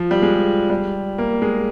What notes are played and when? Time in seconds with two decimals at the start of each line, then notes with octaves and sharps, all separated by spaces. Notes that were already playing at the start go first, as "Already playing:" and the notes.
Already playing: F3
0.11 G3
0.22 G#3
0.70 G3
1.18 A#3
1.42 G#3